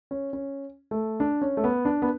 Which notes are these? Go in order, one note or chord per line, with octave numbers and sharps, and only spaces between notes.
C#4
C#4
A3
D4
C#4
A3
B3
D4
B3